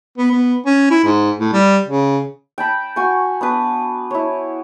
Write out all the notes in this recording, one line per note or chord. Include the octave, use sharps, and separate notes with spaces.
B3
B3
C#4
E4
G#2
A2
G3
C#3
G5 A5 B5
F#4 G#5 C#6
B3 D4 B4
E4 C#5